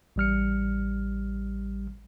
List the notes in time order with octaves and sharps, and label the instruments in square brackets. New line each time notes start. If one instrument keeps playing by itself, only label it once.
[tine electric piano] A1 G3 F6 C#7